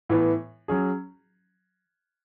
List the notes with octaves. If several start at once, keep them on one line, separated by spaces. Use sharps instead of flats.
A2 E3 B3
F#3 C#4 G#4